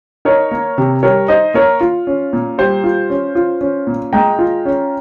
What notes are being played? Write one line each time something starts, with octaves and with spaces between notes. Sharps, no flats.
D#4 A#4 C#5
A#3
C3
G3 A#4 C#5
D#4 C5 D#5
A#3 A#4 C#5
F4
C#4
A#2
G3 C5
F4
C#4
F4
C#4
A#2
G#3 G5 A#5
F4
C#4